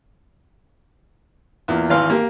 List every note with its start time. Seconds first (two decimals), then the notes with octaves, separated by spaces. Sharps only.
1.68 E2 A#2
1.90 G#1 E3 F5 C6
2.09 A#3 G4